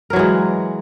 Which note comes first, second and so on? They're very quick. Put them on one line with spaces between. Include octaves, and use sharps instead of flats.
A#4 F#3 E3 G#3